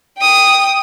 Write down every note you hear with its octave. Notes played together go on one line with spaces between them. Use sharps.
G5 D#6